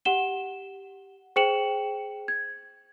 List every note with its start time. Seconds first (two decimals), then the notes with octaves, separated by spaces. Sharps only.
0.05 G4 F#5 E7 G7
1.36 G#4 C5 G5 C#7 E7 F#7
2.28 G#6